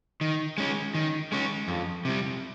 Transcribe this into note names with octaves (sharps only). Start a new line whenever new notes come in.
D#3
G#3 C#4
D#3
G#3 C#4
F2
C3 G3